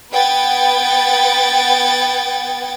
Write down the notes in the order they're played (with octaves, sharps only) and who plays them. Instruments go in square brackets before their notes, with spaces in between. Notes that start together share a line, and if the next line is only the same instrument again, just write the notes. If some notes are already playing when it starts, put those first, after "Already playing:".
[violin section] B3 B4 F#5 G5 G#6 A6